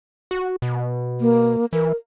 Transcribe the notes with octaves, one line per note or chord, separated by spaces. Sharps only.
F#4
B2
A#3
E3 A#4